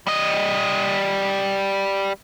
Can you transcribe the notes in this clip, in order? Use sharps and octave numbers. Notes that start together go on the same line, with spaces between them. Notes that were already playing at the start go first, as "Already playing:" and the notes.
G3 D#5